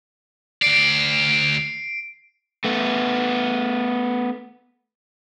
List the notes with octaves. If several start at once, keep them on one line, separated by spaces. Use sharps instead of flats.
D2 D5 C7 D7
A3 B3